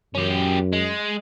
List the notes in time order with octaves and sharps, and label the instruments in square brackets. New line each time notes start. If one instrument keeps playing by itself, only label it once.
[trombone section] F#2 [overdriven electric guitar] C#4 G4
[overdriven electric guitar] G#3